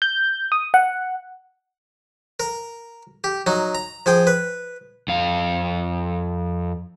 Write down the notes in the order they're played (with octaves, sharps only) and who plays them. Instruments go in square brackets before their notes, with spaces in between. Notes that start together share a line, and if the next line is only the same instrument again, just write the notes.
[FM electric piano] G6
D#6
F#5
[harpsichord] A#4
G4
F#3 D#4
A#5
F3 G#4 G5
B4
[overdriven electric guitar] F2 F5